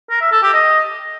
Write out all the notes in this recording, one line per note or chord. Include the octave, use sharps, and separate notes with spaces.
A#4
E5
A4
G4
D#5